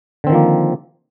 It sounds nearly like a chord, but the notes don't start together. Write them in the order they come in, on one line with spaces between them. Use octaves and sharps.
D3 C4 D#3 F3 A#3